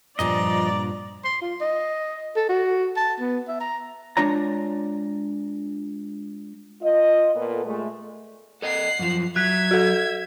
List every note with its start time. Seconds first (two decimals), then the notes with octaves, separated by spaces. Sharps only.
0.19 G2 A#2 F3 D4 D5 D#5 A#5
1.24 C6
1.41 F4
1.61 D#5
2.36 A4
2.49 F#4
2.96 A5
3.20 B3
3.48 E5
3.60 A#5
4.17 G#3 D4 F4 C#5 A#5
6.82 F4 D#5
7.34 A#2 B3 A4
7.65 A#2 G#3 A3
8.62 A4 D5 D#5 F#5 C7
8.99 F#2 F3
9.36 F#3 E5 F#6 G#6 B6
9.71 F#4 A4